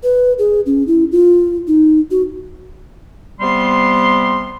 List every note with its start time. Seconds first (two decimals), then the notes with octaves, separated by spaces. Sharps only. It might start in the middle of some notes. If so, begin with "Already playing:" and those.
0.03 B4
0.39 G#4
0.66 C#4
0.87 E4
1.12 F4
1.67 D#4
2.11 F#4
3.41 C3 G3 B3 C6